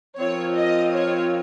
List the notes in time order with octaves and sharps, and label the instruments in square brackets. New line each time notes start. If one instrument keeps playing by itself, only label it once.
[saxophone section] F3 C4 F4 A#4 [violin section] C#5
[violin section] D#5
C#5